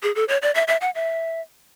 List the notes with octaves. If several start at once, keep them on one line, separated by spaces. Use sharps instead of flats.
G#4
A4
C#5
D5
E5
E5
F#5
E5